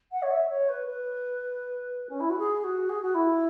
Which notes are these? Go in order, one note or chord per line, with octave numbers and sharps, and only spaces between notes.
F#5
C#5
E5
C#5
B4
B4
C#4
E4
F#4
G#4
F#4
G#4
F#4
E4